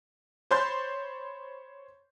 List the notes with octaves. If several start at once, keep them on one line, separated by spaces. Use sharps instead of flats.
C5 C#5 B5 C6 G6 A6